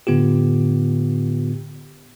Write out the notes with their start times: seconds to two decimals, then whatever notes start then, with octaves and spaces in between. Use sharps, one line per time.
0.07 A2 D3 B3 F4 G4